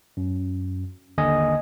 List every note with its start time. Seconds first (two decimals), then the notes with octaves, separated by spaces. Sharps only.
0.17 F#2
1.18 G1 D#2 D3 D#5 G#5